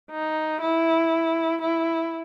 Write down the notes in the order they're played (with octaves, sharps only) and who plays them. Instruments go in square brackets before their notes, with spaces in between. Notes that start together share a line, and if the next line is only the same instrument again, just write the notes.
[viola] D#4
E4
E4